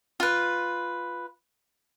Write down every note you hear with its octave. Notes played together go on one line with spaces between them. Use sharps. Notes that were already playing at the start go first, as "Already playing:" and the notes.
F4 B4